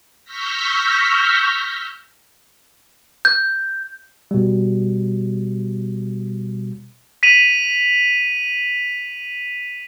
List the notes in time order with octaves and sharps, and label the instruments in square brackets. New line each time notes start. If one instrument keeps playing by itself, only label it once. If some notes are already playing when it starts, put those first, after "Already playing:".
[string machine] C#6 E6 F6 G6 A#6 B6
[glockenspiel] G6
[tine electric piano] B2 G3
[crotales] B6 D#7 F7 F#7